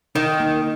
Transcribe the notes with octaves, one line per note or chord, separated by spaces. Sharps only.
D#3 D#4
A#3